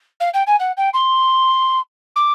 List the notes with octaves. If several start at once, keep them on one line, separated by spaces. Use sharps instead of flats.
F5
G5
G#5
F#5
G5
C6
D6